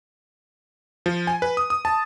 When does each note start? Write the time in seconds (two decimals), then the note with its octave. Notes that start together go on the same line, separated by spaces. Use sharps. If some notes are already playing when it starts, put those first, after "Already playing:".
1.06 F3
1.27 G#5
1.42 B4
1.57 D#6
1.70 D#6
1.85 A5